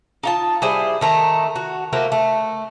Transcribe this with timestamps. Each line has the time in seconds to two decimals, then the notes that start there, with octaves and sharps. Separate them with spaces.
0.23 D#4 F4 A5
0.62 G3 E4 G#4 C5
1.01 D#3 A3 A#5
1.56 F#4
1.93 A3 A#3 F#4 C5
2.12 A3